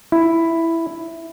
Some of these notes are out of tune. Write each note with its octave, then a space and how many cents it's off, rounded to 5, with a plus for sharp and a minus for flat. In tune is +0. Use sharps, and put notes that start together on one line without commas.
E4 +5